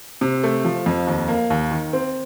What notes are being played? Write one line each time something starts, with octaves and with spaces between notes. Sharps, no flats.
C3
A3
F3
F2
D#2
A#3
D#2
D#3
C4